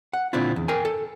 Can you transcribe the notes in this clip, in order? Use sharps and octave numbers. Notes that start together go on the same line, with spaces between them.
F#5
A#2 D3 C4 D4 E4 F4
E2
A#4 G5 G#5
A4